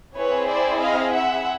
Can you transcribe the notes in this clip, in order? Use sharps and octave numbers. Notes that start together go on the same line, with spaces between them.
C4 E4 G#4 B4 C#5
C5 D5
D#5 F5
E5 F#5